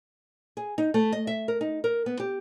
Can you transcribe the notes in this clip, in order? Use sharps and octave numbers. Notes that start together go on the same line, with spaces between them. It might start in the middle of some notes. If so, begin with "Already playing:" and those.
G#4
D#4
A3
D#5
E5
A#4
D#4
A#4
B3
G4